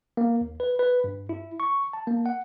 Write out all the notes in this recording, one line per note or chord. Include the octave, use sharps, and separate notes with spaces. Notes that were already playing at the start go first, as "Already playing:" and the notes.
A#3
D#2
B4
B4
G2
E4
C#6
A5
A#3
F#5